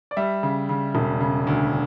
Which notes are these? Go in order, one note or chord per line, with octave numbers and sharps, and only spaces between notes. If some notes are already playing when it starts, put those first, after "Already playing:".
D5
G3 E5
C#3
C#3
E1
C#3
D2